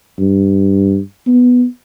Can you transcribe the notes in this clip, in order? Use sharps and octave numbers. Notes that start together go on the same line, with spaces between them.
G2
B3